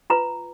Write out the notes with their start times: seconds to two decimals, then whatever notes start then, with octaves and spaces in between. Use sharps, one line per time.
0.10 F4 B4 A#5